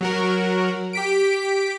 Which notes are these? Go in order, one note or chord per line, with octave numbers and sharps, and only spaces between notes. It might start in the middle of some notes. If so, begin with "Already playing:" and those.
F#3 F#4 A#4
G4 B6 D7